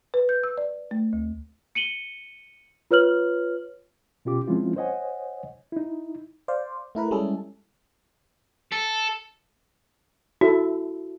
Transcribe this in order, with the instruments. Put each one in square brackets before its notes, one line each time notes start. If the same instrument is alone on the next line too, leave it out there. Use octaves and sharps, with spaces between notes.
[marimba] B4
G6
E6
D5
A3
D2
[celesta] C#7 D#7 F#7 G7
F4 B4 C#5 F6 F#7
[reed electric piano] B2 C#4 F4 G4 D6
F3 G#3 C4 C#4 E4 F4
C5 C#5 D#5 F#5 G#5
D#4 E4
[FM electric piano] C5 D5 F5
A3 E4 A#4 B4
G3 G#3 C#4 E4 G#4 A4
[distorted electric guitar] A4
[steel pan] E4 A4 [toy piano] F#4